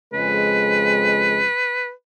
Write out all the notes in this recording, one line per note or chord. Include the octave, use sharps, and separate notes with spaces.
F2 C#3 G#3 B4